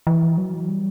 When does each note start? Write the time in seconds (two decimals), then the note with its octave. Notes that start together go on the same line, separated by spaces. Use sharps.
0.07 E3
0.38 F#3
0.68 G3